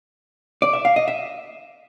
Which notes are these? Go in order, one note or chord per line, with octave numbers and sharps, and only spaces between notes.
D5
E5
F5
D#5
E5